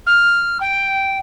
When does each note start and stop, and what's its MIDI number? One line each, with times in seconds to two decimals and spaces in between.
0.06 0.58 89
0.60 1.18 79